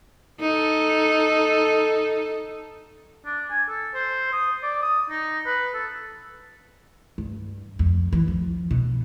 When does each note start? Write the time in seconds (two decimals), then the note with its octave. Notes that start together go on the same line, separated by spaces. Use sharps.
0.41 D#4 A4
3.25 D4
3.50 G#5
3.69 A4
3.94 C5
4.33 D#6
4.63 D5
4.82 D#6
5.10 D#4
5.46 B4
5.74 A4
7.18 G2
7.79 F2
8.13 E3
8.28 F3
8.71 B2